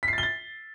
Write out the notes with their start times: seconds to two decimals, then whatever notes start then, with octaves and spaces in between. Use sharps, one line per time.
0.03 B6
0.08 C7
0.13 A6
0.18 G7
0.23 A6